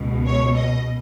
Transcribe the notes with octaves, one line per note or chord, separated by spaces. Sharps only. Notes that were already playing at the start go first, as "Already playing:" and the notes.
Already playing: C#2 B2
C#5
D#5